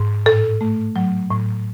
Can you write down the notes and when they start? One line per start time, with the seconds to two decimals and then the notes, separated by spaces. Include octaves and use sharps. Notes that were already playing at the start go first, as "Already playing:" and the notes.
Already playing: G#2
0.26 A2 A4
0.61 A3
0.96 F#3
1.30 A2